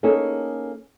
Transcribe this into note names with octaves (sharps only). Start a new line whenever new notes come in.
A#3 C#4 D#4 G#4 A4